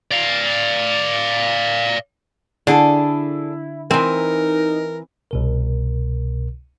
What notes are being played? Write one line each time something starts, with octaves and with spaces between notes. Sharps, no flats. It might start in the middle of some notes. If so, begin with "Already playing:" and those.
D5 F5
D3 D4 E4 G#4 A4
E3 C4 D#4 A#4 G#5
C2 B2 A#4